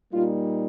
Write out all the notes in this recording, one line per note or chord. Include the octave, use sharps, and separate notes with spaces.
A#2 G3 A#3 D#4 F4